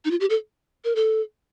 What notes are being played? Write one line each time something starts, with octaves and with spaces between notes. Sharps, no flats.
D#4
F4
G4
A4
A#4
A4